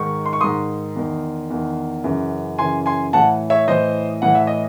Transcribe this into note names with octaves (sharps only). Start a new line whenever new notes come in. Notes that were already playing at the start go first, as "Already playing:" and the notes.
Already playing: G#2 D#3 C#6
C6
C#6
G#2 D#3 C6 D#6
E2 D#3
E2 D#3
F#2 C#3 E3
F#2 C#3 E3 G#5 C6
G#5 C6
A2 E3 F#5 A5
C#5 E5
A2 E3 C5 D#5
A2 E3 F#5
E5
D#5